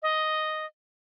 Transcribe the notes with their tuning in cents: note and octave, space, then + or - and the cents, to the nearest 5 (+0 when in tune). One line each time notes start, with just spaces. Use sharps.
D#5 +0